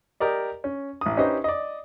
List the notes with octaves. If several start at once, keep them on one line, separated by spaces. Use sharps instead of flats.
G4 A#4 D5 D#5
C#4
A1 D#6
C#4 D#4 G4 B4 C5 D#5
D5 D#5